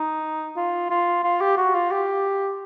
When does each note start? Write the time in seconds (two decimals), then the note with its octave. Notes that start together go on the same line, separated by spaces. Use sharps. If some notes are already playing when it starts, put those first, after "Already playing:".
Already playing: D#4
0.57 F4
0.90 F4
1.24 F4
1.41 G4
1.58 F#4
1.75 F4
1.91 G4